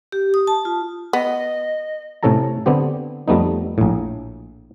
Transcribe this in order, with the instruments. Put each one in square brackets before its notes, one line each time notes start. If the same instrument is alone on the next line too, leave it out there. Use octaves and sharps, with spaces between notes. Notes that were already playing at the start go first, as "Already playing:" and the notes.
[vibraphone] G4
D#6
A5
F4
[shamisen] B3 [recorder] D#5
[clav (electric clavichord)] A2 C3 C#4 A4 A5 A#5
D3 B3 C4 G4
F2 G3 A3 B3 D#4
A#1 A2